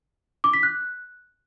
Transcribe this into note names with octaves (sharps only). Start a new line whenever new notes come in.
D6
B6
F#6